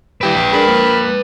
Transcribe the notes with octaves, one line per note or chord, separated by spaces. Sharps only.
E3 G4 B4 G5 D7
A#1
D4 G#4 A#4 B5
F3 A#3